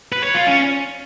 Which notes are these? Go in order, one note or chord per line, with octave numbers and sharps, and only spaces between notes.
B4
C#5
F4
C#4